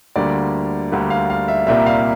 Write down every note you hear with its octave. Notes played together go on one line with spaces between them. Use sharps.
D2 D3 G3 A#3 D5
D2 D3 G3 A#3
F5
F5
E5
C2 A#2 G3 A#3 E5
F5